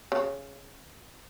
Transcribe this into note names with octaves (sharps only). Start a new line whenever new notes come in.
C#3